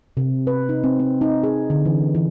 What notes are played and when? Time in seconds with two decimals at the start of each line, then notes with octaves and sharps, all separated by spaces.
0.17 C3
0.47 B4
0.69 D#4
0.84 C4
1.00 C4
1.21 D#4
1.43 G#4
1.70 D3
1.86 E3
2.15 E3